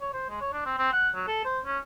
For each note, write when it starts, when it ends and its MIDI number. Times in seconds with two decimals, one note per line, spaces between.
0.01 0.10 73
0.13 0.28 72
0.29 0.39 56
0.41 0.48 73
0.53 0.62 62
0.66 0.77 60
0.78 0.91 60
0.93 1.09 78
1.15 1.27 54
1.28 1.42 69
1.45 1.60 72
1.65 1.79 61